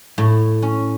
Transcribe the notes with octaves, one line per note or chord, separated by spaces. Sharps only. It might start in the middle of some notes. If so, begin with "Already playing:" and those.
A2
C#4